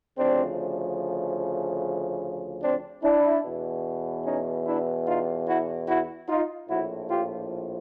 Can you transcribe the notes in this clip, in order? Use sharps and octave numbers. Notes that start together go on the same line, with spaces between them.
D2 C#3 F3 C4 D4
C4 D4
D4 E4
E2 B2
C#4 D#4
D4 E4
D#4 F4
E4 F#4
E4 F#4
D#4 F4
A#1 A2 F3 E4 F#4
F4 G4